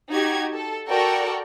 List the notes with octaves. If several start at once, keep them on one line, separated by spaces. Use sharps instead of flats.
D#4 F#4 G4 G#6
A4
F#4 A4 A#4 D5 G5 C#6